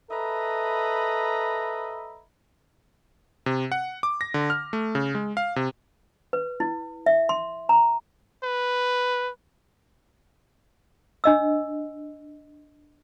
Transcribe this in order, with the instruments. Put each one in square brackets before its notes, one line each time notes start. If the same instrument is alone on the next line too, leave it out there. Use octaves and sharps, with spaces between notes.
[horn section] A4 B4 D#5 E5 A#5 B5
[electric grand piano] C3
F#5
D6
A#6
D3
F6
A3
C#3
G#3
F5
C3
[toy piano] B4
E4
E5
C6
A#5
[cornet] B4
[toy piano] D4 D#5 E6